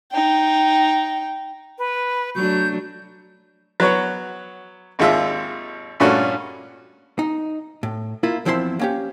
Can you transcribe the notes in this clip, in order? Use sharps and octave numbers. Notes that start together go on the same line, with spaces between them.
D#4 G5
B4
F#3 A3 D4 G6
F#3 B3 C#5
G#1 D#2 G#3 F4 E5
G2 A#2 A3 C#4 F#4
D#4
A2
A#3 E4 F4
E2 F3 C4 E4 C5 C6
A#3 C#4 G4